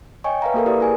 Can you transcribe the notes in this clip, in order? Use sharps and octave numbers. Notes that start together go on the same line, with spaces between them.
C#5 D#5 G5 G#5 C#6
B4 E5 F5 A#5
A#3 F#4 A4 A#4
E4 G4 B4 D5 D#6
E4 G#4 G#5